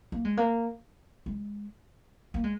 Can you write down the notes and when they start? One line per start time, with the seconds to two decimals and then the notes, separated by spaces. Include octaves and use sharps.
0.12 A#3
0.25 G#3
0.37 A#3
1.26 G#3
2.34 A#3
2.44 G#3